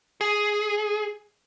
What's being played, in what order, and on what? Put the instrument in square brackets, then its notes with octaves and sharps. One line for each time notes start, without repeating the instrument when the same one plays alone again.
[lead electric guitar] G#4